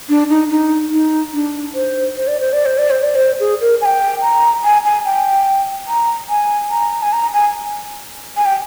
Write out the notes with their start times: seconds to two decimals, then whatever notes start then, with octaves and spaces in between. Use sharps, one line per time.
0.09 D4
0.29 D#4
0.50 D#4
0.91 D#4
1.33 D4
1.75 C5
2.16 C5
2.28 D5
2.40 C5
2.53 D5
2.66 C5
2.78 D5
2.90 C5
3.03 D5
3.15 C5
3.40 G#4
3.61 A#4
3.81 G#5
3.85 G5
4.22 A#5
4.64 G#5
4.85 G#5
5.05 G5
5.88 A#5
6.29 G#5
6.71 A#5
7.02 G#5
7.13 A#5
7.33 G#5
8.37 G#5
8.46 G5